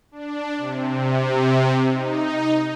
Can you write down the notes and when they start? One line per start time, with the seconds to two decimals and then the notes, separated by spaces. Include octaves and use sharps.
0.12 D4
0.57 C3
1.89 D#4